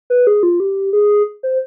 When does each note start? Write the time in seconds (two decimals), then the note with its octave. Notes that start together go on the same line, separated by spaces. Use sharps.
0.10 B4
0.27 G#4
0.43 F4
0.60 G4
0.93 G#4
1.43 C5